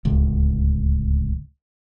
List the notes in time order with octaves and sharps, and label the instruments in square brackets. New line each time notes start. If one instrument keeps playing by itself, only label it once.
[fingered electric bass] D1 C#2